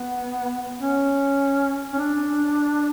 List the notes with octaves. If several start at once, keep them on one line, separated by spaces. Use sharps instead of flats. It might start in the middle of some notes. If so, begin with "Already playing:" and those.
Already playing: B3
C#4
C#4
D4